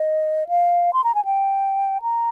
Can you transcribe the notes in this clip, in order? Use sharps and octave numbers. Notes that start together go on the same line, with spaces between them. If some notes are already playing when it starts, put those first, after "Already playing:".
Already playing: D#5
F5
C6
A#5
G#5
G5
A#5